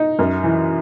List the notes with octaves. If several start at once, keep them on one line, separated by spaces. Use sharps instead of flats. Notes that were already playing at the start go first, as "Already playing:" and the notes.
Already playing: D#4
F#2
E3